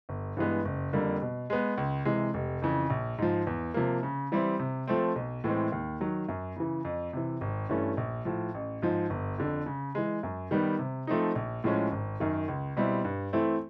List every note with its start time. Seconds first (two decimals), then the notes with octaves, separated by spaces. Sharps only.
0.09 G1
0.37 G2 E3 G#3 B3
0.65 F#1
0.93 F2 D3 G3 A#3
1.22 B2
1.50 G#3 B3
1.78 C#2
2.05 C3 E3 G#3
2.34 F1
2.62 F2 C#3 E3
2.90 A#1
3.18 G#2 F3
3.47 E2
3.74 C3 F3 A#3
4.03 C#3
4.32 E3 G3 C4 E4
4.59 C3
4.87 F3 A3 C4
5.16 B1
5.44 A2 E3 G#3 C4
5.72 D#2
6.00 D#3 F#3
6.28 F#2
6.56 C#3 E3
6.85 F2
7.13 C3 E3
7.41 G#1
7.69 G2 E3 A3 C#4
7.97 A#1
8.25 A2 F3
8.54 A1
8.82 G#2 F3
9.10 G1
9.38 F2 D3
9.66 C#3
9.95 E3 G#3
10.23 F#2
10.51 D#3 G3 B3
10.79 C3
11.07 F3 A3 C4 D#4
11.35 A#1
11.64 A2 F3 G#3 C#4
11.92 G#1
12.20 F#2 D#3
12.48 C#2
12.77 B2 G3 C4 E4
13.05 G2
13.33 E3 A3 C4 E4